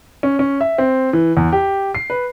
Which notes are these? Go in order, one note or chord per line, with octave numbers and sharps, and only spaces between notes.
C#4
C#4
E5
C4
E3
E2
G4
C7
B4